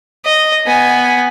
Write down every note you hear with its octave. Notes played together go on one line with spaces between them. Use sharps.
D#5
B3 G#5